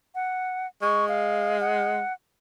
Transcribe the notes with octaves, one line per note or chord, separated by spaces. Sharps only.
F#5
G#3 C#6
F5
F#5